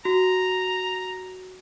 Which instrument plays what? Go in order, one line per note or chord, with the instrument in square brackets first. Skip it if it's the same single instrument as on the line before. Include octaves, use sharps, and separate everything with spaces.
[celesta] F#4 [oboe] A#5